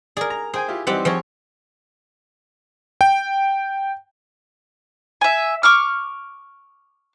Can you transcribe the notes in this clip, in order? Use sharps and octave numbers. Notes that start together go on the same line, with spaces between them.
G#4 A#4 D5
A#5
G#4 C5 G5 G#5
E4 F4 G4
E3 G3 C4 D#4 G4 F#5
F3 C4 G#4 C#5 C#6
G5
E5 G#5
C#6 D6 F6